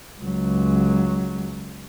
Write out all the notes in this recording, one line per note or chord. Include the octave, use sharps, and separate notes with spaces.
C#2 F#3